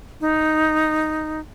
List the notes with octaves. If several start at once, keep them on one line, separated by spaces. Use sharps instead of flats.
D#4